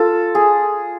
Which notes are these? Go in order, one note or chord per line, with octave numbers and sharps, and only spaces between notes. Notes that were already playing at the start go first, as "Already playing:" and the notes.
Already playing: F4 A4
G#4